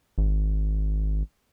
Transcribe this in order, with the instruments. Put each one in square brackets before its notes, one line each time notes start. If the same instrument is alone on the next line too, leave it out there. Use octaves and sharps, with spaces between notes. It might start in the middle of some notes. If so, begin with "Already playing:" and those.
[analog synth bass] G#1